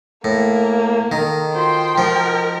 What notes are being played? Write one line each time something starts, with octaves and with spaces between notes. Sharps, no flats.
A2 A#3
D#3 D#4 A4 A#4
F4 F#4 C5 G5 C6
F3 F#4 A#4